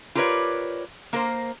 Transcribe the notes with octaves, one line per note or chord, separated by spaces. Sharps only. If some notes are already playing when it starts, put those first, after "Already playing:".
F4 G4 A#4 B4 C#5 D5
A#3 A#4 C5